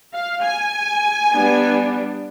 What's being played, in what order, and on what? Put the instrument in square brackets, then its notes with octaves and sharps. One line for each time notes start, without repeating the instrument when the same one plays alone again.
[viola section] F5
G#5
G3 B3 D4